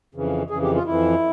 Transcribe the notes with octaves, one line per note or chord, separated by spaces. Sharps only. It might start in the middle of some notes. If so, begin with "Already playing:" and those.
F2 C#3 E3
F2 C#3 E3 G#4
G4
F4
F2 E3 E4